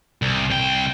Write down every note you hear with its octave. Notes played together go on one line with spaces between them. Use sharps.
C2
C2 G5